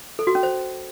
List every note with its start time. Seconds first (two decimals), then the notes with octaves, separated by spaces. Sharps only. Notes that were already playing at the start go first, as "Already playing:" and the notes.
0.19 A4
0.27 F#4
0.35 C#4
0.43 C5